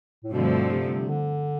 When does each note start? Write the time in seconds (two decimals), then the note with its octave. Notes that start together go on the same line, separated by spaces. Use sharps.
0.24 A2
0.33 G2 B2 D3 F3 A3 C4
0.71 C3
1.09 D3